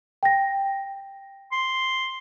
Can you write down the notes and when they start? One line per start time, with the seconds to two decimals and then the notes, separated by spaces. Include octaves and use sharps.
0.23 G5 A#6
1.52 C6